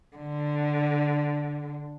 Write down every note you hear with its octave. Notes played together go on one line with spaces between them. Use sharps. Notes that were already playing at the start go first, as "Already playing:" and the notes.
D3